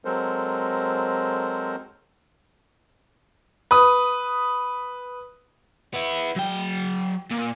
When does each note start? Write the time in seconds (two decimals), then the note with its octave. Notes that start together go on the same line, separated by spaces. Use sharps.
0.05 F#3 G#3 C4 A4 A#4 C5
3.71 B4 D#6
5.94 B3 E4
6.36 F#3 G5
7.31 A#2